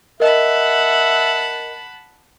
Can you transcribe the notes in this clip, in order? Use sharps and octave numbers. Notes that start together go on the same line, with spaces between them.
A#4 D#5 E5 F#5 A5 B5